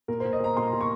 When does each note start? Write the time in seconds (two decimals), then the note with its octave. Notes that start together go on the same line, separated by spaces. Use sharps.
0.08 A#2 A#4
0.20 A#2 C5
0.33 D#5
0.40 A#2 A#5
0.57 A#2 C6
0.73 A#2
0.81 C#6